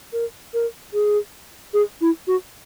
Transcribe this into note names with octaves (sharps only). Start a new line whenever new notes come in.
A#4
A#4
G#4
G#4
E4
F#4